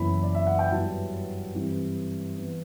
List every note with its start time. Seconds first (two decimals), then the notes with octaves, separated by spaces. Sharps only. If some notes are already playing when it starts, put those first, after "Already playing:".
Already playing: F#1 F#2 E3 B3 E4 B5
0.23 D5
0.35 E5
0.47 F#5
0.59 G5
0.71 G2 F#3 B3 E4 A5
1.55 G2 E3 G3 C4 E4
2.38 E3 B3